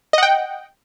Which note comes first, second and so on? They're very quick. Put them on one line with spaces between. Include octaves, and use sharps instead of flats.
D#5 F#5 G5